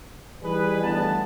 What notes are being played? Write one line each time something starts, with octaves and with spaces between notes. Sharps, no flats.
E3 G3 D#4 G#4 B4
G1 G3 A3 B3 A5